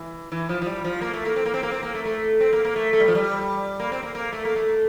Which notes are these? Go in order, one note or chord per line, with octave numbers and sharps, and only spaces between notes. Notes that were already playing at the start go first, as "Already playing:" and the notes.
Already playing: E3
E3
F3
F3
G3
F3
A#3
A3
A#3
C4
A#3
C4
A#3
C4
A#3
A3
A3
C4
A#3
A#3
A3
A3
G3
F3
G3
A#3
C4
A#3
A#3
A3
A#3
A3